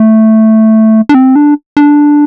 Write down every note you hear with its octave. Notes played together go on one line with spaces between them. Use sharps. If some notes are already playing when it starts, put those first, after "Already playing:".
Already playing: A3
D4
C4
D4
D4